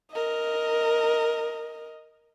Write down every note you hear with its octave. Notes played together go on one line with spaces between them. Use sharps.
A#4 D#5